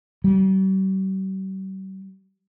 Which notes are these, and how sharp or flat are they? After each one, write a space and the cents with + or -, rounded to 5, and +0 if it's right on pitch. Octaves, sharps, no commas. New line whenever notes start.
G3 -45